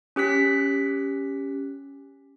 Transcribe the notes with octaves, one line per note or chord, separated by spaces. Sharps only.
C#4 G4 F#6 B6